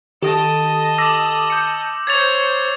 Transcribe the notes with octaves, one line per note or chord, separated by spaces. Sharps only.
D#3 G4 A4 D#5 A5
D6 E6 A#6
G6 C#7 E7
C5 C#5 G#6 A6 F7